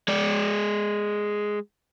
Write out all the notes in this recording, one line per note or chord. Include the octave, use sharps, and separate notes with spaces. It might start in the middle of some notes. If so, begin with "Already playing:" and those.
G#3 D5